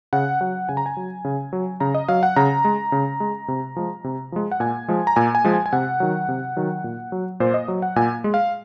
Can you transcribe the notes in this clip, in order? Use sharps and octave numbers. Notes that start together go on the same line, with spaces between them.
C#3 F#5
F#3 F#5
C#3 G#5
A#5
G#5
F#3
C#3
F#3
C#3 A#5
D#5
F#3 F5
F#5
C#3 A#5
G#3
C#3
G#3
C3
F3 G#3
C3
F3 G#3
F#5
A#2 G#5
F3 G#3
A#5
A#2 G#5
G#5
F3 G#3
G#5
G#5
C3 F#5
D#3 F#3
C3
D#3 F#3
A#2
F#3
A#2 C5
D#5
F#3
F#5
A#2 G#5
G#3
F5